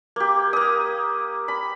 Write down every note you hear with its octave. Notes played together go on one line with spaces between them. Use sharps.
A#3 G4
A#3 D#6
B5